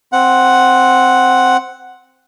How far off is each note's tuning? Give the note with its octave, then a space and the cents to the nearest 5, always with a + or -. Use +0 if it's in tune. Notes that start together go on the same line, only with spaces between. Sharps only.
C4 +0 F#5 +0